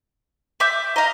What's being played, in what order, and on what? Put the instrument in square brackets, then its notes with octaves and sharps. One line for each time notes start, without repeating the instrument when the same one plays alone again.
[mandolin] E5 D6 G6
[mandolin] D#5 F5 [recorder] A#5